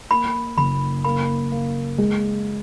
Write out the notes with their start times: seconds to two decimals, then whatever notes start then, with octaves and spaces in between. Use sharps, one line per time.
0.10 A#3 B5
0.57 F#1 B5
1.04 A#3 B5
1.52 A#3
1.98 G#3